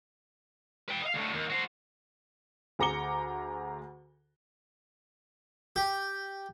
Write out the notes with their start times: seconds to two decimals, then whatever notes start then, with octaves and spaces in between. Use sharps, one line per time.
0.88 B4 G5
1.02 D#5 F5
1.14 D2 A2
1.33 D#2
1.50 F#4 C5
2.79 D2 G#4 A#5 D6 C#7 G7
5.76 G4